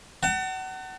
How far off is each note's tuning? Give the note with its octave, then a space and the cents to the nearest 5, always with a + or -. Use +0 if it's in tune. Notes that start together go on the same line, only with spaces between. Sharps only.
F#5 +30 A5 +40